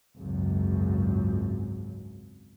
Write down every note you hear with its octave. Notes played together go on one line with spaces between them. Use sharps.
G#1 C#2 F#2